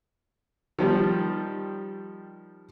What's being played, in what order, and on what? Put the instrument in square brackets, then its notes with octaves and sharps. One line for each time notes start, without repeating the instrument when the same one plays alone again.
[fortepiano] D#3 F3 G3